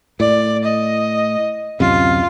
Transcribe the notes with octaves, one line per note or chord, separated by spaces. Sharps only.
A2 D5
D#5
D1 F#2 C3 F4